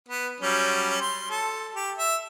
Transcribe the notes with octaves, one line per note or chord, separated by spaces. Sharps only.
B3
F#3 G3 C#4
C6
A4
G4
E5